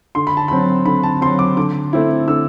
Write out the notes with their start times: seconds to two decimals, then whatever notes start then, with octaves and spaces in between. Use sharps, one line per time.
0.15 D3 C6
0.27 B5
0.37 A5
0.48 F#3 C4 B5
0.86 D3 B5
1.03 A5
1.21 C4 C6
1.26 F#3
1.39 D6
1.57 D3 D6
1.93 A3 C4 E4
2.28 D3 E6